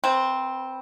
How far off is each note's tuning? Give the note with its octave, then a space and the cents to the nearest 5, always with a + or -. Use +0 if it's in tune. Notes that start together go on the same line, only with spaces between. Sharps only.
C4 +0 B4 -30